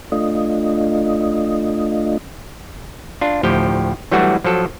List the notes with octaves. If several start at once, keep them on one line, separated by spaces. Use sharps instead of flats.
A3 D4 F4 D#5
D4 F4
D2 A2 F3 G4 G5
E3 F#3 G3 A3 D4 F#4
F3 F#3 A4